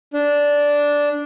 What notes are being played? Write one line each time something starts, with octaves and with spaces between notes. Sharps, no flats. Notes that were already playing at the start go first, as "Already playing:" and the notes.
D4